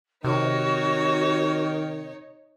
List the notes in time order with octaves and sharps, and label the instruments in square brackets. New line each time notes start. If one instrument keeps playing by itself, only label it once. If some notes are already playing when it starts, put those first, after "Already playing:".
[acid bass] C3 [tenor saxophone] D#3 [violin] D#4 C#5 [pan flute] F#4